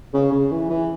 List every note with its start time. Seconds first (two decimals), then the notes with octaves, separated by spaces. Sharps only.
0.14 C#3
0.32 C#3
0.51 E3
0.70 E3